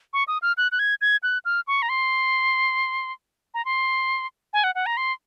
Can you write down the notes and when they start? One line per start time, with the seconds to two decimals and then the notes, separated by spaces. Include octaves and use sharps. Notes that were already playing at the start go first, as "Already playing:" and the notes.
0.13 C#6
0.28 D#6
0.42 F6
0.57 F#6
0.72 F#6
0.79 G#6
1.01 G#6
1.23 F#6
1.45 F6
1.67 C#6
1.82 A#5
1.89 C6
3.54 A#5
3.65 C6
4.53 G#5
4.64 F#5
4.75 F#5
4.86 A#5
4.97 C6